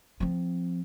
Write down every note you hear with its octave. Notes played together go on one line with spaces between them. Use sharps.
F3 C4